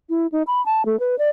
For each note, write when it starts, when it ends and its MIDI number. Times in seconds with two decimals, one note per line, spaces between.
0.09 0.27 64
0.32 0.43 63
0.47 0.64 83
0.66 0.85 81
0.85 0.99 57
1.00 1.18 71
1.18 1.29 74